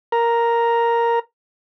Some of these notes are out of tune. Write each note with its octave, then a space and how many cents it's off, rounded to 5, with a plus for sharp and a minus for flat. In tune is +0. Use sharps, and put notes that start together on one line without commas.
A#4 +0 A#5 +0